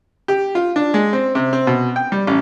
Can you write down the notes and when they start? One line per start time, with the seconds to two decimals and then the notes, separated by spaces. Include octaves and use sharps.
0.28 G4
0.55 F4
0.76 D4
0.94 G#3
1.13 C4
1.35 C3
1.53 C4
1.67 B2
1.96 G5
2.12 G3
2.27 A1